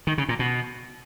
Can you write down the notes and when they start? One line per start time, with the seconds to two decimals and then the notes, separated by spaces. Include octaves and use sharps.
0.07 D#3
0.18 C#3
0.29 A#2
0.39 B2